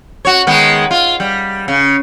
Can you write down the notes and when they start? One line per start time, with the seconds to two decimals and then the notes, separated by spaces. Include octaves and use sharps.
0.25 F#4 C#5
0.47 D#3 G#3 B3
0.91 F4
1.20 G3
1.68 C#3